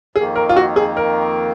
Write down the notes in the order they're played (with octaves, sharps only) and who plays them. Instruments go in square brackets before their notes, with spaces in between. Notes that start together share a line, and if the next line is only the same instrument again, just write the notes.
[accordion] F2 D#3 A#3 [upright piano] G#4
[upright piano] A#4
F4
F#4
G#4
A#4